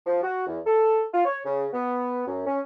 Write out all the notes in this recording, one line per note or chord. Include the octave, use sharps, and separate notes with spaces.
F3
F#4
E2
A4
F4
C#5
C#3
B3
F#2
C#4